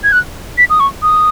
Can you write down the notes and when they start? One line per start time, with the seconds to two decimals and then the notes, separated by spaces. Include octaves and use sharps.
0.04 G#6
0.12 F#6
0.58 B6
0.70 D#6
0.80 C#6
1.03 D#6